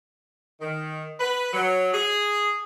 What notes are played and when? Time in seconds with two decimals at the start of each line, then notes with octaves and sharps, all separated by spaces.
0.60 D#3
1.20 B4
1.53 F#3
1.93 G#4